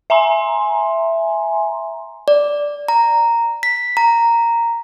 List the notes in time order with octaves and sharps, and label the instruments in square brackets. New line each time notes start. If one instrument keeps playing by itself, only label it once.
[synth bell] E5 G#5 A#5 C6
[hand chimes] D5
A#5
B6
A#5